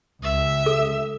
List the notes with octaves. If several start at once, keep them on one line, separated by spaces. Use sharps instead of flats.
C#2 E5
A4